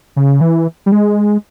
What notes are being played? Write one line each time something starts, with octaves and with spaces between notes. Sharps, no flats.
C#3
E3
G3
G#3